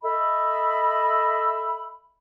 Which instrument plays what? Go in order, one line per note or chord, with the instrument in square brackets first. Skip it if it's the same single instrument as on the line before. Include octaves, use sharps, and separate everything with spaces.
[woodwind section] A4 D#5 E5 B5